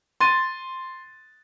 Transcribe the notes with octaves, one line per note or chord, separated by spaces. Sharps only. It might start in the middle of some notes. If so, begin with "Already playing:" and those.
C6 A6 D#7